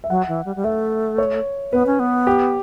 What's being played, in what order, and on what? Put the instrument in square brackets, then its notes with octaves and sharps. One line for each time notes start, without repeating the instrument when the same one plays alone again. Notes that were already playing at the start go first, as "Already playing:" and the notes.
[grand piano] E5
[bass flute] F#3 [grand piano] F#5
[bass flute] E3
G3
G3
[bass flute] A3 [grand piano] E5
[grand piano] C#5
[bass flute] B3 [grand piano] B4
[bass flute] C#4
B3
[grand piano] G4